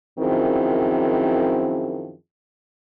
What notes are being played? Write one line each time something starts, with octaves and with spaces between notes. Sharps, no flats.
F#2 D#3 F3 C4 E4 G#4